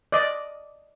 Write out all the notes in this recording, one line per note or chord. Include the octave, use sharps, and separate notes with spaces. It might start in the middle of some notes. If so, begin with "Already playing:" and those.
D5 D#5